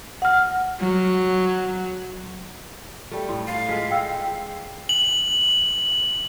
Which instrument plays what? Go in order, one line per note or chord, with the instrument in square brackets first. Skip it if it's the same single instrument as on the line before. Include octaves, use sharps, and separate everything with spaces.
[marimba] F#5 F6
[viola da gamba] F#3
[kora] G3 A3
[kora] A2 [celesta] C6
[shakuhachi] F5 [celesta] C7
[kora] G#3 F4 [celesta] B6
[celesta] G5 E6
[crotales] F#7